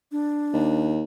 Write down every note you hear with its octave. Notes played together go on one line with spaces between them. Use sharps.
D4
D#2